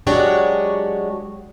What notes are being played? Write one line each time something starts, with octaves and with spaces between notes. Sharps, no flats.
F#3 G#3 D4 F#4 G4 C#5